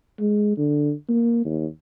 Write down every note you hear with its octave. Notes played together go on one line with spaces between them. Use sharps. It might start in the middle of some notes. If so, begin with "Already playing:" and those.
G#3
D3
A#3
D#2